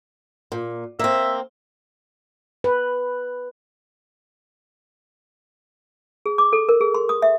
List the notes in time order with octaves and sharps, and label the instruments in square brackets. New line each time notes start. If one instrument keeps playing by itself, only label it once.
[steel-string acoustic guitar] A#2
[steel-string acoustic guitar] A#3 C4 [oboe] E5
[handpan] B4
[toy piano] G#4
D6
A4
A#4
G#4
C6
D#6
E5